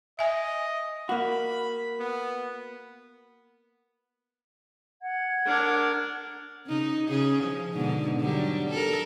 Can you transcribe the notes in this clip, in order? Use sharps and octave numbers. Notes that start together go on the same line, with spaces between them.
D#5 E5 G#5
A#3 F#4 B5
B3
F#5 G#6
D4 A#4
C#3 D#4
C#3 G#4
F3
G#2 B2 D3
D3 F#3 G3
A4 A#4